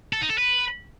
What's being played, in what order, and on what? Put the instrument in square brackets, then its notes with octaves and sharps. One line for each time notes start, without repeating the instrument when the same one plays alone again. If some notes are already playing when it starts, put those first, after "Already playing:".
[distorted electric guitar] A4
D#4
A4
B4